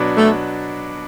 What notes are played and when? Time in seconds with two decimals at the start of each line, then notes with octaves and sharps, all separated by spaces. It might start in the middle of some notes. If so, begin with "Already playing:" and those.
Already playing: B2 F#3 D4 B4 D5
0.17 A3